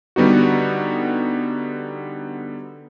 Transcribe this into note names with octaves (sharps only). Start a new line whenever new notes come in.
D3 G3 B3 D#4 F#4